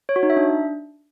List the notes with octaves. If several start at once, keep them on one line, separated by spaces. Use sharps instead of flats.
C#5
F#4
D#4
E5
D4